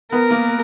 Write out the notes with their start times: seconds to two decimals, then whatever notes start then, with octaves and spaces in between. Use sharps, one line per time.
0.12 B3 A#4
0.30 A#3